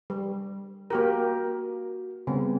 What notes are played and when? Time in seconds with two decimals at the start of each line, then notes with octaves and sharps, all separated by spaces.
0.10 G3
0.90 A#3 F#4 G4 A#4
2.27 C#3 G3 B3 C4